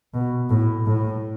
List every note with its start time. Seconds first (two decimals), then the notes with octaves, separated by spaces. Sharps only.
0.14 B2
0.50 A2
0.86 A2